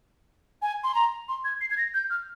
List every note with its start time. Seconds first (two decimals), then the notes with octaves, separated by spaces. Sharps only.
0.62 G#5
0.84 C6
0.95 A#5
1.29 C6
1.44 G#6
1.61 C7
1.71 G#6
1.77 A#6
1.94 G6
2.10 F6